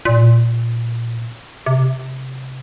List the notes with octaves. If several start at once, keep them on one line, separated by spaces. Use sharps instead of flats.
A#2
C3